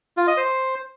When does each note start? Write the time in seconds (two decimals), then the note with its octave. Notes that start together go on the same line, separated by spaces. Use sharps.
0.17 F4
0.27 D#5
0.37 C5